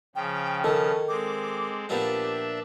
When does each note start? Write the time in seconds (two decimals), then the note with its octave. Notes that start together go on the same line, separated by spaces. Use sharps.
0.15 C#3 F3 G5
0.64 D#3 A4 A5
1.08 G#3 C4 D6
1.89 A#2 F3 B3 D4 G4 E5